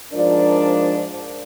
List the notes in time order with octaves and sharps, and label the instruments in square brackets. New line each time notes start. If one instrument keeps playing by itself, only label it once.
[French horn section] G#2 F3 D4 A#4 D5